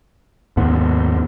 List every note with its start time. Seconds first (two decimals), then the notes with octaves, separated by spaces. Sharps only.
0.57 D#2 G#2 B3